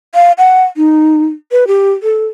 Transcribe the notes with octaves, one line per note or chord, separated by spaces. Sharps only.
F5
F#5
D#4
B4
G4
A4